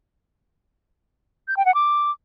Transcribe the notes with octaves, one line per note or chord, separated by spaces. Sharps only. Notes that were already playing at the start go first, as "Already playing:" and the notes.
G6
G5
F#5
D6